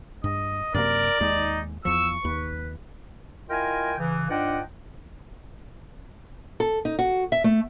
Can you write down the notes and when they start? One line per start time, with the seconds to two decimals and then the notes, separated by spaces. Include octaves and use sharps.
0.24 G2 D#5
0.74 F#2 C3 A#3 A#4 D5
1.21 D#2 G#3 D#4
1.85 E2 F3 C#6 E6
2.25 D#2 B4
3.50 E4 F4 A#4 D#5 G5 G#5
3.99 C#3 E3
4.30 G#2 D4 F4 D#5 F#5 G5
6.60 A4
6.85 D#4
6.99 F#4
7.32 E5
7.44 A3